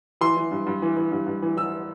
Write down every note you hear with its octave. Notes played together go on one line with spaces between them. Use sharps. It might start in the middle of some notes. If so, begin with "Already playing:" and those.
E3 C6
E3
G2
G2
E3
E3
G2
G2
E3
E3 E6